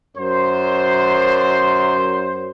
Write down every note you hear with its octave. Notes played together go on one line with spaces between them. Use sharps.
F#2 C5